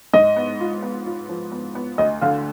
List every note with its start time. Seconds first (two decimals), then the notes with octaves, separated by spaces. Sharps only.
0.13 G#2 D#5
0.36 B3
0.60 F4
0.83 B3
1.06 F4
1.29 F3
1.52 B3
1.75 B3
1.98 D2 D#5
2.21 D3 F5